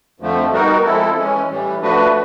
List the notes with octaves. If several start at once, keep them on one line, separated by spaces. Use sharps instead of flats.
F2 D3 F3 A3
G3 B3 D#4 F#4 A#4
F3 G#3 C4 E4 A4
E3 G#3 C#4
A2 E3 G3
F3 A3 D4 F#4 B4